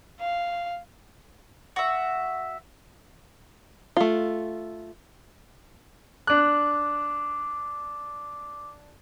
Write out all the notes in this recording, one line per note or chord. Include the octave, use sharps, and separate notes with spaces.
F5
F#4 E5
A3 F4
D4 D6 F#6